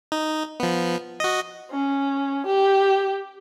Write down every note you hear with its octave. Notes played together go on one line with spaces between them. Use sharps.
D#4
F3 B3
F#4 D#5
C#4
G4